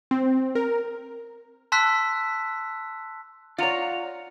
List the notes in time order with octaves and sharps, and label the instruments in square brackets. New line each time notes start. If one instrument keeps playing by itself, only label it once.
[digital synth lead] C4
A#4
[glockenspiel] A5 C6 E6 F#6 B6
[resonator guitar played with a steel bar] F4 C#5 [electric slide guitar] D5 F#5 A#5